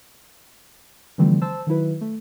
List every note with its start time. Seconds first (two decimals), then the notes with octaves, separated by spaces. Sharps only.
1.18 D3 E3 F3 G3 A3 C4
1.41 C5 A5 E6
1.67 D#3 F#3 E4 B4
2.01 A3